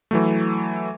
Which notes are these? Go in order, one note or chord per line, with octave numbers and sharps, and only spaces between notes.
E3 F#3 A3